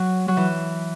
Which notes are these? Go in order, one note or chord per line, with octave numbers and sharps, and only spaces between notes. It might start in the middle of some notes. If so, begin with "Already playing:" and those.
Already playing: F#3
F#3
E3